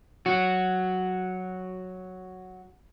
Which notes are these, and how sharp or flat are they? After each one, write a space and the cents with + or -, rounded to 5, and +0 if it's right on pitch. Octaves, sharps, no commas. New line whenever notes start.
F#3 +0 F#4 +0